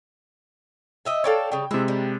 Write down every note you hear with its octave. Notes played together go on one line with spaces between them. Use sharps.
D#5 E5 G5
A4 C#5 D5 F5 G5 A5
C#3 G3 G5
C3 G#3 E4
G3